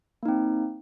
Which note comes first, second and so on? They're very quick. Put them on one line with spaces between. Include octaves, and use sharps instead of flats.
A#3 D#4 C4